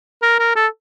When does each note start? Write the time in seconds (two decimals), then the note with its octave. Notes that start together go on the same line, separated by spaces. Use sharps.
0.23 A#4
0.39 A#4
0.56 A4